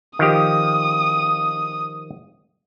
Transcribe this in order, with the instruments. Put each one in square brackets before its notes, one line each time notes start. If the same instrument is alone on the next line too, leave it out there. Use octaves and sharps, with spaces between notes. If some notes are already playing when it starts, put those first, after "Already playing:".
[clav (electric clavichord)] D#3 F3 G4 [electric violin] D#6